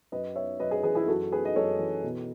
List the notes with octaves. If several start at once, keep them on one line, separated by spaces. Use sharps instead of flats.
F#2 B4 D#5
B3 C#5 E5
F#2 B4 D#5
G#4 B4
E3 G#4 B4
E4 G#4
F#2 F#4 A4
B3 G#4 B4
D#5
F#2 A4 C#5
E3
B2